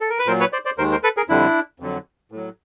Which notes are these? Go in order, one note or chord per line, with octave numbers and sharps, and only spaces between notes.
A4
A#4
B4
A#2 F#3 A#4 C5
B4 C#5
C5 D5
C5 D5
D#2 D#3 G#3 A#4 C5
A#4 C5
A4 B4
G#4 A#4
F2 D3 G3 D4 E4
F2 D3 F#3
A2 F#3